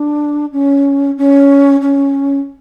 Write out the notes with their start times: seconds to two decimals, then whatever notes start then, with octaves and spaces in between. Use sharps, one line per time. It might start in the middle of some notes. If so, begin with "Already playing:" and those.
Already playing: D4
0.52 C#4
1.17 C#4
1.81 C#4